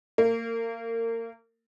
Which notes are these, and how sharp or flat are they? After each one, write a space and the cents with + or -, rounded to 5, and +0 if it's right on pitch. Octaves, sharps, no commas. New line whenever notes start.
A#3 -30